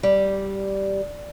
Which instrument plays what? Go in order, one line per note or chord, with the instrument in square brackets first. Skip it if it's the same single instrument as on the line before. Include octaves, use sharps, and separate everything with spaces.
[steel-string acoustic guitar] G3